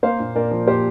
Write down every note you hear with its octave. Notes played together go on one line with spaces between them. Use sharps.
A#3 C5 F5
A#2
A#2 A#4 D5
F3
A#2 G4 C5